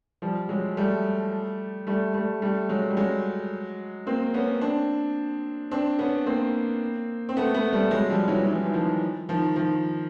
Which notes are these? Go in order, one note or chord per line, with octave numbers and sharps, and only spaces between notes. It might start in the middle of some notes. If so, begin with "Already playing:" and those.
F3 G3
F#3 G#3
G3 A3
G3 A3
G3 A3
G3 A3
F#3 G#3
G3
F#3 G#3
A#3 C4
B3 C#4
C4 D4
C4 D4
B3 C#4
A#3 C4
C4
A3 B3
A3 B3
G3 A3
F#3 G#3
F3 G3
E3 F#3
E3 F#3
E3
D#3 F3
D#3 F3
D#3 F3